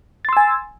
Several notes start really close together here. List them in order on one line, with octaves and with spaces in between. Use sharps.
A6 C6 E6 G#5